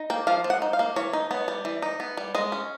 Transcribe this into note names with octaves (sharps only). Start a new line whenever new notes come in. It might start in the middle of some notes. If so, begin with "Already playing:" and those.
Already playing: D#4
A#3 G5
F3 F5
F3
F#5
D#4
F5
A#3
E3 C#5
D#4
B3 C#5
G3
E3
D#4
B3
G3
G#3 D#5
C#4